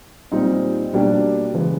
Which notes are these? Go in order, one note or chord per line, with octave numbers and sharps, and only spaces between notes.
A#2 G3 C4 D#4
B2 G3 A#3 D4 G4
C#3 E3 G#3